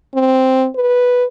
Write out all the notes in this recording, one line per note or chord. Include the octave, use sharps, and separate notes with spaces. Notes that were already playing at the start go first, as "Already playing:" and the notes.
C4
B4